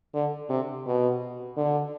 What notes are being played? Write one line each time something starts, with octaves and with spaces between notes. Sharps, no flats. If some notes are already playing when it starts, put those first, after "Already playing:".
D3
C3
B2
D3